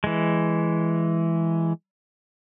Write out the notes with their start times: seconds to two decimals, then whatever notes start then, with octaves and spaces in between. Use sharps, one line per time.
0.04 E3 G#3